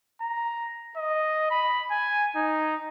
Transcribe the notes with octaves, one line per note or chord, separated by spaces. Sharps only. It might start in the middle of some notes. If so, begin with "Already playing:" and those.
A#5
D#5
B5
G#5
D#4